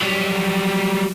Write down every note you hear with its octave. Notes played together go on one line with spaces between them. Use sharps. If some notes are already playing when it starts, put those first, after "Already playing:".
F#3 G3